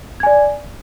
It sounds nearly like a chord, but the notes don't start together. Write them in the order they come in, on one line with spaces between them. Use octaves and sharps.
G#6 G#5 D5